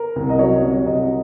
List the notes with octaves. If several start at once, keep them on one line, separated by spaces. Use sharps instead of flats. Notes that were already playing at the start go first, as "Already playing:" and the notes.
Already playing: A#4
C2
D#5
F#3 C#5
C3
C2 D#5